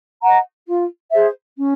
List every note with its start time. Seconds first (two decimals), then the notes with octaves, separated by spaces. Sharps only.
0.22 D#5 F#5 A#5
0.66 F4
1.11 G#4 C5 E5
1.57 C#4